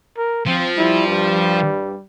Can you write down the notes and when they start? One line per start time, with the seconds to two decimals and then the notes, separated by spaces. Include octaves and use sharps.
0.18 A#4
0.46 F3 C4
0.77 G3 E4
1.07 G2